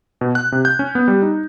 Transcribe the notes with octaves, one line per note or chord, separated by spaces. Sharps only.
B2
F#6
C3
G6
C#4
B3
G3
D#4